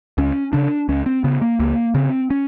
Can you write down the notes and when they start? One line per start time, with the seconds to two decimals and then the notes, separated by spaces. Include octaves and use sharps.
0.18 C#2 C#4
0.53 C#3 D4
0.89 C#2 C#4
1.06 C4
1.24 C#3 B3
1.41 A#3
1.60 C#2 A#3
1.95 C#3 C4
2.30 C#4